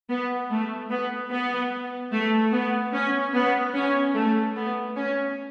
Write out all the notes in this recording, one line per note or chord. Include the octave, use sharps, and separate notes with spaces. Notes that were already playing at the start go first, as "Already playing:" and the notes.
B3
A3
B3
B3
A3
B3
C#4
B3
C#4
A3
B3
C#4